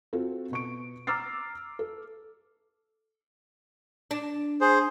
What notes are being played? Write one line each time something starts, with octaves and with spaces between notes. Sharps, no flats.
C4 F4 F#4 A4
B2 C#6 D7
A#5 D6 E6 F6 A6 C7
A4
D4
G#4 C5